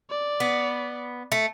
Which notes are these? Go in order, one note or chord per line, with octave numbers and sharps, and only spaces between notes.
D5
B3
A3